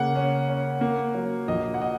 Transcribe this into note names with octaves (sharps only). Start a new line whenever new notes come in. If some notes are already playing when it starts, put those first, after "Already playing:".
Already playing: C#3 A#3 F#5
C#4
C#4
A#3
F#3
A#1 D#5
F#5
A#2 D#5